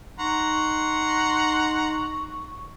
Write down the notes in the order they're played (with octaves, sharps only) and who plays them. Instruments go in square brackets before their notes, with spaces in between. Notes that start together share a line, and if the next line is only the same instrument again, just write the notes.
[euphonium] D#4 [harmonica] F#5 A#5 C6 [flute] C#6